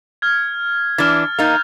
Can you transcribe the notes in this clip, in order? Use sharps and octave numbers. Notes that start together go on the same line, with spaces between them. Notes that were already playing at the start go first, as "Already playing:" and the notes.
F6 G#6
E3 D4 F6 A6
A#3 D#4 G6 A6 F7